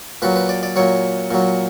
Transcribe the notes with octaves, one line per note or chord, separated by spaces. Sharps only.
A#2 F#3 B4
B4
D5
D5
A#2 F#3 C#5
A#2 F#3